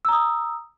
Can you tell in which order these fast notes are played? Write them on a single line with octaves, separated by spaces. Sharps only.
E6 A#5 D#6